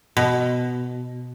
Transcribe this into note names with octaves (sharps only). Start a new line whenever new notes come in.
B2